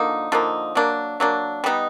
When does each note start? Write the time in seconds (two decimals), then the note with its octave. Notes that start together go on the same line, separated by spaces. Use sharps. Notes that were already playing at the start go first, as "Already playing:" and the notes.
Already playing: D3 F3 A#3 D#4
0.32 D3 F3 A#3 D#4
0.75 F#3 A#3 D4
1.20 F#3 A#3 D4
1.64 G3 B3 D#4